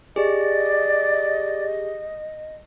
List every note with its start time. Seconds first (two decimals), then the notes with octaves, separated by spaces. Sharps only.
0.16 G4 G#4 D5 D#5